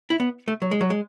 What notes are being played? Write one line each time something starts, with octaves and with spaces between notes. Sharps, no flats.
E4
B3
A3
F#3
G#3
F#3
G#3